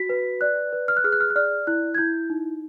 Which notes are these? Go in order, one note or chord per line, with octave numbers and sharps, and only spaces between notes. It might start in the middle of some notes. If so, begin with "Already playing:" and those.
Already playing: F#4 B6
B4
D5 F#6
B4
F6
F#6
G#4 F6
F#6
F6
F#6
D5 F6
E4 F#6
G#6
E4 G6
D#4